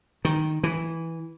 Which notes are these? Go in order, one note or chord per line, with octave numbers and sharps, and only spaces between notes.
D#3
E3